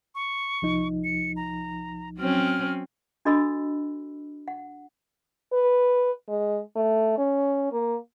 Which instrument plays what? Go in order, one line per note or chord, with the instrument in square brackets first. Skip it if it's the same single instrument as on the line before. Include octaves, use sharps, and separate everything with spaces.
[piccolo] C#6
[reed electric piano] C2 F3 D#4
[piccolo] C#7
A#5
[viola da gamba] F#3 C4 C#4 [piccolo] F6
[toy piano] D4 F#4 A4 D#5 B5 E6
F#5
[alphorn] B4
G#3
A3
C#4
A#3